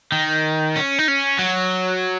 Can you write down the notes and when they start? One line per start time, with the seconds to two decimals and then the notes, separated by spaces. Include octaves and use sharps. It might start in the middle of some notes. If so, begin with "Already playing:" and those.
0.12 D#3
0.76 C#4
0.99 D#4
1.08 C#4
1.39 F#3